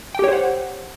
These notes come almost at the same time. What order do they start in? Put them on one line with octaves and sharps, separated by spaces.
G5 G4 C#5 C5 F#5